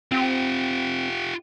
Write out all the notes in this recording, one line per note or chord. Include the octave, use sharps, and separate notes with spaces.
C4 F4 G4